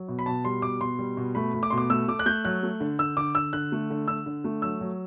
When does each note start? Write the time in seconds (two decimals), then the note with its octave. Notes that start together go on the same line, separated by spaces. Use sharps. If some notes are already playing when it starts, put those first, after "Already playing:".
Already playing: F#3
0.08 B2
0.19 B5
0.26 B2 A5
0.45 G3 C6
0.62 B2 D6
0.80 B2 C6
0.99 G3
1.17 B2
1.35 A3 B5
1.54 A3
1.63 D6
1.70 B2 C6
1.78 D6
1.90 A3 E6
2.08 A3 D6
2.19 F#6
2.26 A3 G6
2.45 F#3 F#6
2.63 A3
2.80 D3
2.99 D3 E6
3.17 D3 D6
3.35 D3 E6
3.53 D3 F#6
3.72 A3
3.90 D3
4.08 D3 E6
4.26 D3
4.44 A3
4.62 F#3 E6
4.81 F#3